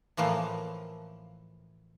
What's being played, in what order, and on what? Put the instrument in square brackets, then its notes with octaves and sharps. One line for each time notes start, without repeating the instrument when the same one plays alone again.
[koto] A2 E3 F3 A#3